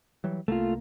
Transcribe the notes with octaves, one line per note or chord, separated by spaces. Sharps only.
E3 F#3 G3
C2 A3 A#3 F4